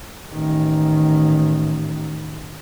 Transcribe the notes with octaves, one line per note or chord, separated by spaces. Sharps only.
A1 D#3